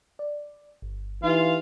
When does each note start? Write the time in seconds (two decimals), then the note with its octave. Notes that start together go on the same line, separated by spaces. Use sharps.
0.19 D5
0.82 G1
1.24 E3 D#4 F4 G4 F5